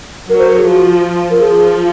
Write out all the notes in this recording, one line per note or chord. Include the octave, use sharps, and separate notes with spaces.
F#3 A#4
C5
A#4
G#4
F3 F#4
A#4
F3 G#4